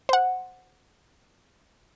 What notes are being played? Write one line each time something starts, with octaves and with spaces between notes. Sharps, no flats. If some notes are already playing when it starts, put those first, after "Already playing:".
C5 F#5